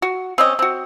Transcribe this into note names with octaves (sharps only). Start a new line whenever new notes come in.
F#4
C4 C#4 D#5
C4 F#4